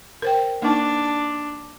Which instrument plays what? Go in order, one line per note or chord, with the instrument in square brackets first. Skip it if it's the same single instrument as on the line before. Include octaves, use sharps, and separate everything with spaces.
[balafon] A#4 C5 G5
[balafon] A#3 D#4 [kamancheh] D4